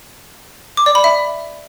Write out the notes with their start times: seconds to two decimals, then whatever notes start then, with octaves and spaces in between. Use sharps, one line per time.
0.77 D6
0.86 D5
0.95 B5
1.04 E5